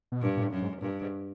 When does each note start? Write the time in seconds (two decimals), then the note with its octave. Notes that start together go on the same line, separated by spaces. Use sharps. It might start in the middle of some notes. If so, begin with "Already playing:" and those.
0.12 B2
0.22 G2 A#2
0.37 A#2
0.41 A2
0.52 F#2
0.62 G#2
0.81 G2 A#2
1.02 G#2